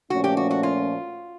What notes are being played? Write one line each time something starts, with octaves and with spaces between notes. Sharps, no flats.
A#2 F3 A3 C#4 F#4
G4
F#4
F#4
F4